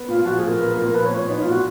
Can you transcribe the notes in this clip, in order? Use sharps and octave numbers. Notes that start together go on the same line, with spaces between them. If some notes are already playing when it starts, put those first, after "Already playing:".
Already playing: B3
A#2 F4
F3 F#4
G#4
A#2
A#4
B3
A#2
A#4
F3 B4
C#5
A#2
C#5
B3 D#4
F4
A#2
F#4